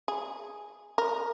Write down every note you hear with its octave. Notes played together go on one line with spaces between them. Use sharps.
G#4
A#4